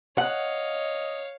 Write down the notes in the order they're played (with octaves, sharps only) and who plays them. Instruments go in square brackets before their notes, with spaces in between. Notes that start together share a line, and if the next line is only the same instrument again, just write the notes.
[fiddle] C#5 F5 [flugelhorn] D#5 [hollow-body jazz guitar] F#5